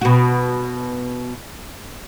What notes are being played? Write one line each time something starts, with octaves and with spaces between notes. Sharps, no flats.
B2 F#4